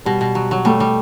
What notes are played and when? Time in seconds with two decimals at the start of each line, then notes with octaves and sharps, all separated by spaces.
0.05 B2 G3
0.21 B2
0.35 F#3
0.51 F#3
0.65 G3 A3
0.80 G3